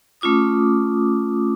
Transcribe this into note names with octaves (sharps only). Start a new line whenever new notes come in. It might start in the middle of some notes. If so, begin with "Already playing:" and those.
A3 C#4 F4 D6 D#6